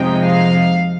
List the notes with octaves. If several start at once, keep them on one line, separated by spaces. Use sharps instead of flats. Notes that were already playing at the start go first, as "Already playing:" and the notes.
Already playing: F2 C3 F3 G#3 D#4 G5
F5